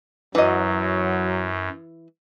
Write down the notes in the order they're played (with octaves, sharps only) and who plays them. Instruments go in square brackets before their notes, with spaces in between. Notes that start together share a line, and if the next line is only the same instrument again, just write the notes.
[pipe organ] F#2 [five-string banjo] E3 D#5 [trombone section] F#3